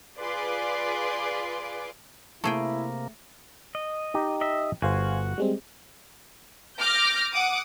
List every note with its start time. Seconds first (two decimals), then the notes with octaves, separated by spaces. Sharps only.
0.19 F4 G#4 B4 D5 C6 D6
2.44 C3 A3 A#3 E4 G#4 G5
3.75 D#5
4.14 D#4 G4
4.41 D#5 E5
4.82 G1 F#4 C5 F5 G#5
5.38 G3 G#3 C4
6.79 D6 F6 G6 A#6
7.32 F#5 D6 D#6